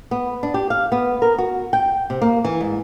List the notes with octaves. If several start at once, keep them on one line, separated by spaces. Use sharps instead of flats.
B3
D4
G4
F5
B3
A#4
F#4
G5
C3
A#3
E3
G#2